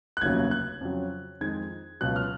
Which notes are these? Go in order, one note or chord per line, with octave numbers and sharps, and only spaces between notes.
F#6
F1 D#2 C#3 F#3 G#6
F#6
F2 C#3 F#3
F2 D#3 G#3 G#6
C#2 B2 F#3 F#6
F6